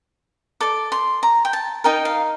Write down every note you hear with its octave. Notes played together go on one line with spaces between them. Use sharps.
A4 D5 D6
C6
A#5
G5
A5
D#4 A#4 D#5 G5
F5